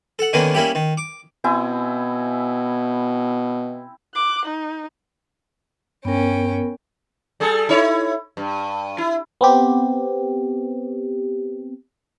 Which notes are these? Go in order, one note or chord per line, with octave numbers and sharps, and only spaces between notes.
A4 F#5
D3 D#3 A#3 B3 C#4 D4
G3 A#3 C#4 E4 G4
D#3
D6
B2 C4 E4 G#5
D6 F#6
D#4
G2 B3 C#4 A#4 G5
G3 G#4 A4
D#4 E4 C#5
G2
E4
B3 C4 G4